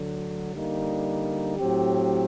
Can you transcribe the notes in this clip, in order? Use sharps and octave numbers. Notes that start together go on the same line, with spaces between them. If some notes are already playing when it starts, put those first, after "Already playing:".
Already playing: D2 D3 F#3
D3 G3 A#3 D#4
A2 F#3 C4 G4